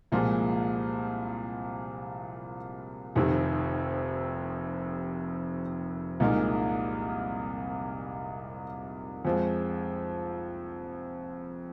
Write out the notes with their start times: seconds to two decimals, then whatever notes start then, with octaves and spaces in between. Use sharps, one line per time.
0.12 C2 A#2 F3 G#3
3.15 F1 F2 C3 D#3 C4
6.20 C2 A#2 G#3 D#4 A#4
9.25 F2 F3 G#3